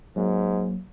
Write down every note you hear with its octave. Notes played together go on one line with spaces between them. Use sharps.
G#2 F#3 A#3